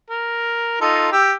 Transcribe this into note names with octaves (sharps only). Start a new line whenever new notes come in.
A#4
D#4 F4 A4
G4 E6